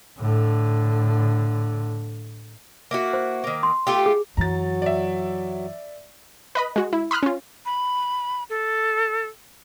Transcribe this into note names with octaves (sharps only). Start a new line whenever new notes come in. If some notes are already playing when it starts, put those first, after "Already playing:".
A2 D3
A#3 E4 F#4
C5
D#3 A#3
C6
A3 F4 G4
G#4
F#2 E3 F#3 A#5 A6
D5 E5
B4 D#5 B5
G#3 F#4
E4
B5 C6 D#6 F6 F#6
C#4 F4
B5
A4